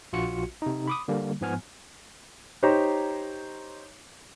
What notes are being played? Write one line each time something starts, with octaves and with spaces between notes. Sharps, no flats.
A#1 F4 F#4 C#7
C3 D#4
B5 D6 D#6
D3 G3 A#3
G#2 F3 B3 G#5 F6
D#4 G4 C5 C#5 A#5